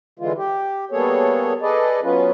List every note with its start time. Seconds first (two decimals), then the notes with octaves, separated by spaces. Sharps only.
0.19 D3 E3 G#3 F4
0.37 G4
0.91 G3 A#3 B3 G#4 A4 C#5
1.62 G#4 A4 B4 D5 D#5
2.03 F#3 B3 C#4 F4 B4